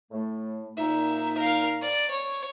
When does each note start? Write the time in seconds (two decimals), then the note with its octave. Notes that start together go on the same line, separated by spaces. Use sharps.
0.12 A2 A3
0.78 A#2 D#4 E5
1.38 A#4 F5
1.82 D5
2.11 C#5